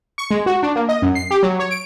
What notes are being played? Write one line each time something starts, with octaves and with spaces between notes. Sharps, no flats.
C#6
G#3
F#4
D4
A#3
D#5
F#2
C7
G4
F#3
C#5
D7